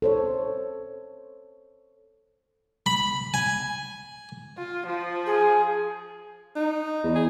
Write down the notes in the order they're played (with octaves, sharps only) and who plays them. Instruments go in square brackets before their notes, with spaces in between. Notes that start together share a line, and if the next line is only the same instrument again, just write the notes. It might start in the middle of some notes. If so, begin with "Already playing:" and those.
[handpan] A4 C5 C#5
[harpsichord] B5
G#5
[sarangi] F4
F3
[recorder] G#4
[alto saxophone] D#4
[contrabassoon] E2
[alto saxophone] G#4